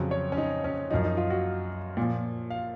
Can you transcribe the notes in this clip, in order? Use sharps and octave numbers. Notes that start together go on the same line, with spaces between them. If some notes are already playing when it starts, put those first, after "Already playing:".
Already playing: F2 C#3 F#3
C#5
C#4
D#4
C#4
F#2 F3 D#4
D#4
F4
F#4
A#2 F3
F5